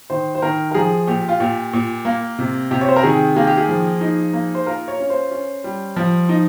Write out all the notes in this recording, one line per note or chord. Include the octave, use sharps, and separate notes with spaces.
D#3 C5
C5
D#3 A#4
A#4
F3 G#4
A#2 G4
F4
A#2 G4
A#2
A#3
C3
C3 G4
C#5
C5
A#4
D#3 G#4
A#3 G#4
G4
G#4
F3
D#4
A#3
C5
F4 A#4
C#5
C#4
C5
C#4
G3
F3
D#4